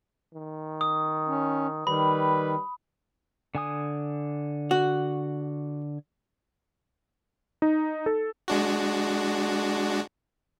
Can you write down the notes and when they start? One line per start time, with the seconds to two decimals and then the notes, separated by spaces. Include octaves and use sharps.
0.34 D#3
0.81 D#6
1.28 C#4
1.87 D#3 G3 B4 B5
3.55 D3 G#5 D#6
4.71 F#4
7.62 D#4
8.06 A4
8.48 G#3 D4 F#4